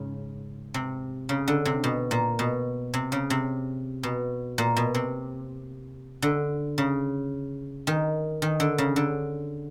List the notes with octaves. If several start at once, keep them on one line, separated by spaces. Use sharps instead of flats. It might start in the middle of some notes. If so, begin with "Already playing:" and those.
Already playing: G#2 C#3
C3
C#3
D3
C3
B2
A#2
B2
C3
C#3
C3
B2
A#2
B2
C3
D3
C#3
D#3
D#3
D3
C#3
D3